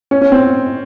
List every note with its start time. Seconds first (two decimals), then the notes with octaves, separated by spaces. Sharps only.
0.11 C#4
0.21 C#4
0.32 C4